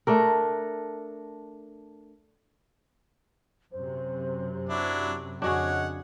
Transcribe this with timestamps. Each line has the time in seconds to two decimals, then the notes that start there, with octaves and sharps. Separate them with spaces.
0.07 A3 D4 A#4
3.72 F#2 C3 C5
4.69 F#3 D4 E4
5.42 F2 C#3 D4 F#4 G#4 C#5 D#5 F#5